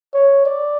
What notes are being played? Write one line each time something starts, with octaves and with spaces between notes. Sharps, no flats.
C#5
D5